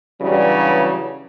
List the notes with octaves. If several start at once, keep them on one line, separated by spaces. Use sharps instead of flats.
G2 C#3 E3 F#3 G3